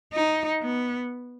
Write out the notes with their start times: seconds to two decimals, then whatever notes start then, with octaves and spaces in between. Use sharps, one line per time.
0.13 D#4
0.62 B3